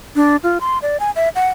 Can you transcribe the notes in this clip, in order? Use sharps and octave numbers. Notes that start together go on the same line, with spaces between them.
D4
F4
C6
D5
G#5
E5
F#5